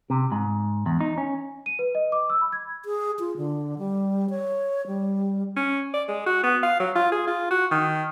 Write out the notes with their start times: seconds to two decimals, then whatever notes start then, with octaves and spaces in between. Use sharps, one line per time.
0.10 C3
0.32 G#2
0.86 E2
1.01 D#4
1.18 C#4
1.66 D#7
1.79 B4
1.95 D#5
2.12 D6
2.30 E6
2.41 B5
2.52 G#6
2.85 G#4
3.19 F4
3.37 D3
3.78 G3
4.30 C#5
4.87 G3
5.56 C#4
5.94 D5
6.09 G#3
6.27 F#4
6.44 B3
6.63 F5
6.80 F#3
6.96 F4
7.12 G#4
7.27 F4
7.51 F#4
7.71 D#3